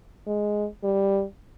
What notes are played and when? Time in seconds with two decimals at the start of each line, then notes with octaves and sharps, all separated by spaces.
0.27 G#3
0.84 G3